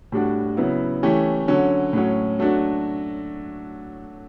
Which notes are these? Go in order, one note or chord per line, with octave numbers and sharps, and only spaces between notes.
A2 G3 D4 F#4
C#3 F#3 B3 E4
E3 A3 C#4 G4
D3 F#3 C#4
A2 F#3 C#4
F#3 A3 D4 F#4